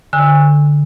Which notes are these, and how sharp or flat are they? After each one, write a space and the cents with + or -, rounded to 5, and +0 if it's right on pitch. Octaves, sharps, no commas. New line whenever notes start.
D3 +0 G#5 -30 E6 -15